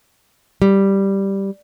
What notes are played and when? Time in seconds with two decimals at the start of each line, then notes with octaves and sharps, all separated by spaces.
0.62 G3